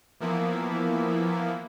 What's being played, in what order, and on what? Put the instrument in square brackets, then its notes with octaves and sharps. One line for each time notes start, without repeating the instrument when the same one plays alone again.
[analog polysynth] E3 F3 A#3 B3 E4